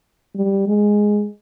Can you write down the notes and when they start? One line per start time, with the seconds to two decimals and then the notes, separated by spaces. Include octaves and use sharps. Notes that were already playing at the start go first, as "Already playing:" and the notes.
0.35 G3
0.67 G#3